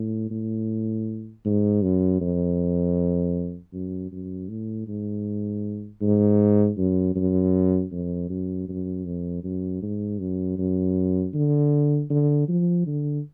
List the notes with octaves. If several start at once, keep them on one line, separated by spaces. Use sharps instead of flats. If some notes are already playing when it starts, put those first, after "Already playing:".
Already playing: A2
A2
G#2
F#2
F2
F#2
F#2
A2
G#2
G#2
F#2
F#2
F2
F#2
F#2
F2
F#2
G#2
F#2
F#2
D3
D3
F3
D3